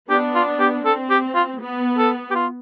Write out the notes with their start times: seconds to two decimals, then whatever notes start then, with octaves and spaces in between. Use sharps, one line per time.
0.10 B3 D4 G4
0.35 F4
0.60 G4
0.85 C4 A4
1.10 G4
1.35 F4
1.60 B3
1.98 A4
2.31 G4
2.35 F4